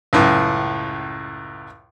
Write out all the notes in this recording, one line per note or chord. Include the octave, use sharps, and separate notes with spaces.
C#2 F#2 A2